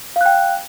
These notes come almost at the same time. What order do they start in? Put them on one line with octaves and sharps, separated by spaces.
F5 F#6 G5